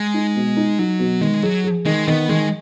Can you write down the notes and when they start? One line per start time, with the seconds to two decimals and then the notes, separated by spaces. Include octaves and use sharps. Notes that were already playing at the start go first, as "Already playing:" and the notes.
Already playing: G#3
0.14 D#4
0.36 B2
0.57 D#4
0.79 F#3 D#4
0.99 B2
1.21 D#3 G#3
1.43 F#3 G#4
1.64 G#4
1.85 D#3 G#3
2.08 D#3 B3
2.29 D#3 G#3